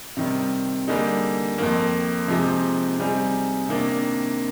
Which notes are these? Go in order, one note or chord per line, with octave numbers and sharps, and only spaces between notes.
C3 D#3 G3
D3 G3 A#3 D#4 G#4
F2 D#3 A#3
C3 F3 G#3 D#4 G4
C3 G3 C4 D#4 G#4
C3 D#3 A#3 D4